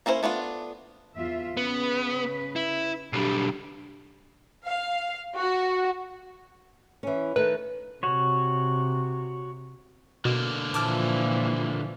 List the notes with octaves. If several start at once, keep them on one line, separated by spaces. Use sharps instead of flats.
A#3 C#4 E4 A#4 C5
A3 B3 D4 F4
E2 F4 E5
C#3 B3 B4
E4
B1 G3 D4 G4
F5
F#4
E3 C#4
D#3 A3 A4 B4
C3 F#4 C#5
B2 D3 A#3
A#2 E3 F3 A5 D6 F6